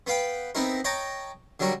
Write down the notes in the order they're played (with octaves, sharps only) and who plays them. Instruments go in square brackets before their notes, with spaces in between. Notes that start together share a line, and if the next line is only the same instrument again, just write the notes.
[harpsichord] B3 B4 F5 G5
B3 C4 D#4 E4 A#4
C#5 D#5 G5 A5 A#5
D3 F#3 G3 A#4 C#5